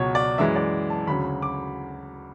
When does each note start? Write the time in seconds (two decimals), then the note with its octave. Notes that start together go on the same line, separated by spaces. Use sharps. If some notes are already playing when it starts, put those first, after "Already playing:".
Already playing: C#2 B2 F#3 C#5
0.15 D5
0.38 F#2 E3 G#3 E5
0.56 D5
0.90 A5
1.07 D2 C#3 F#3 B5
1.42 D6